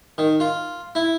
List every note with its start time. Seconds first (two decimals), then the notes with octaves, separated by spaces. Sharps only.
0.18 D#3
0.40 F4
0.95 E4